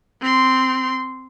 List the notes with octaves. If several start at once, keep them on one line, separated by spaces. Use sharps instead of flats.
C4 C6